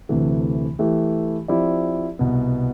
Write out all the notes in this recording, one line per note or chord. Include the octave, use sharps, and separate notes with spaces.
D2 C3 E3 A3
E3 A3 E4 G4
F3 C4 E4 G4 D5
C2 B2 B3